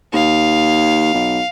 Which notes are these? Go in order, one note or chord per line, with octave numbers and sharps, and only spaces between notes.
D#2 F5
B1